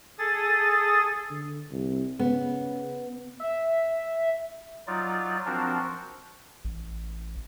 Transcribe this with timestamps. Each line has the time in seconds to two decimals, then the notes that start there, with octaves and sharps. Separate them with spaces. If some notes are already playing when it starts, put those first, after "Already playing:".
0.18 G#4 A4 D#6 A6
1.30 D3
1.71 C2
2.19 C#3 B3
3.40 E5
4.87 F#3 D#4 F4 D5
5.46 F3 C4 D4 F#4 A#4 C5
6.65 A1